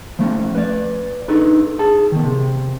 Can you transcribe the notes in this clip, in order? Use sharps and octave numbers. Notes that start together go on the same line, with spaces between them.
F3 A3 A#3 C#4
B4 D5
D4 D#4 A4 B4
G#4 A5
B2 D#3
C3